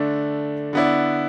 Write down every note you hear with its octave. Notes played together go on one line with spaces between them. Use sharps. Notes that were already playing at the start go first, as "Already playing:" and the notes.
Already playing: D3 A3 D4
D3 B3 E4 D5